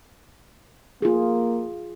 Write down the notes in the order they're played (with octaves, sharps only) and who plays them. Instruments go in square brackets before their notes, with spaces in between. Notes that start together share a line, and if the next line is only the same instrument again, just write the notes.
[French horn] A#3 [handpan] F4 G#4